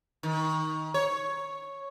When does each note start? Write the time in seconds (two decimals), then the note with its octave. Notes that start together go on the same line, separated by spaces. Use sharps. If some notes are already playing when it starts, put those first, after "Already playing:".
0.23 D#3
0.94 C#5